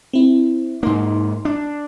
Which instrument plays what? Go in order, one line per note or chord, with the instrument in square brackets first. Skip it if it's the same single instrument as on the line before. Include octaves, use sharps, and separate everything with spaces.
[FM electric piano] C4 E4
[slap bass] G#2 A#3 [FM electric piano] D#4 C6
[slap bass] D4